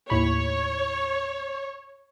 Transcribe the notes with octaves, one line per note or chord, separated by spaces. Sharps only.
D#2 A2 C#5 B5